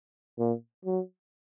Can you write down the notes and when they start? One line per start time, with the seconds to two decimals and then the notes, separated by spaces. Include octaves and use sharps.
0.39 A#2
0.85 F#3